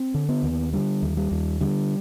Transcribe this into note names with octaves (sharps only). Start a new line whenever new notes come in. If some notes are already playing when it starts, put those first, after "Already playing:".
Already playing: C4
D3
B3
D#2
D3 G3
D#2
G3
D#2
D3 G3